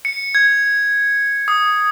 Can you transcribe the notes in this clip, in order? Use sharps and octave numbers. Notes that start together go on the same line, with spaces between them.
C#7
G#6
D#6